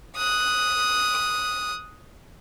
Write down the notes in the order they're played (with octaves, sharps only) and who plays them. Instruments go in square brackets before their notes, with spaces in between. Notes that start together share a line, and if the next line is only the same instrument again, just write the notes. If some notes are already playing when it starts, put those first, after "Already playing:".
[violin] D#6 F#6